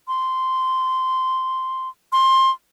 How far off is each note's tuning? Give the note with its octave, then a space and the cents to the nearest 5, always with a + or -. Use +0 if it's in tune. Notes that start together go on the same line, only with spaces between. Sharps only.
C6 -10
C6 +20